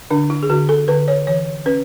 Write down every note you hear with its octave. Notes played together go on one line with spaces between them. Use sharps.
D3 D4
E4
G#4
D3 F#4
A4
D3 B4
C#5
E3 C#5
C#4 B4